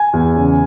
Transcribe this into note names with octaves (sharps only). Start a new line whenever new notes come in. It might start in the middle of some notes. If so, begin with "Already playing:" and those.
Already playing: G#5
E2
C#3